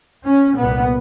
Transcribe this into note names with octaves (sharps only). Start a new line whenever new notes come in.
C#4
C2 A#2 B3